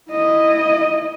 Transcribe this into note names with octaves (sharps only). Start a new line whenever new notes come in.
E4 D#5